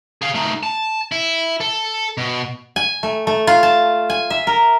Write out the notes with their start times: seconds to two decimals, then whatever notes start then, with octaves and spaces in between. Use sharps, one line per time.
0.22 G#4 F5
0.34 A3 D#4
0.63 A5
1.12 E4
1.60 A4
2.17 B2
2.76 G#5
3.03 A3
3.27 A3
3.47 F4
3.63 A5
4.10 G#5
4.30 E5
4.47 A#4